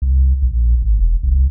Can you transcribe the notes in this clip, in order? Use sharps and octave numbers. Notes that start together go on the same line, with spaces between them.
C2
A#1
G#1
E1
C2